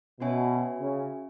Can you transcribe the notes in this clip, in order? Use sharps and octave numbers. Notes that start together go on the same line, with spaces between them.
B2 C#4 F#4 C#5 E5 G#5
C#3